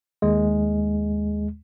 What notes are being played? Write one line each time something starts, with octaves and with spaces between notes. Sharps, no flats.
D#2 G#3